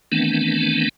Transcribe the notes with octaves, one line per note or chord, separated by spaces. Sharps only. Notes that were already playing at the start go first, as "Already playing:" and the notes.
D#3 E3 A3 B3 C4 D4